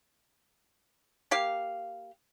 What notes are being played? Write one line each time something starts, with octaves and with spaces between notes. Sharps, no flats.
A#3 G4 F5